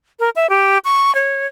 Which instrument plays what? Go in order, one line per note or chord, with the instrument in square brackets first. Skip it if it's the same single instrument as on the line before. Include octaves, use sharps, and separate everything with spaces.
[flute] A#4
E5
G4
C#6
C#5